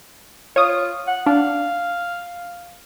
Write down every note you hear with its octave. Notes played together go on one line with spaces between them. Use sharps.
F4 C#5 D#6
F#5
D4 F5